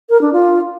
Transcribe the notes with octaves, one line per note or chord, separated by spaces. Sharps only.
A#4
D4
F4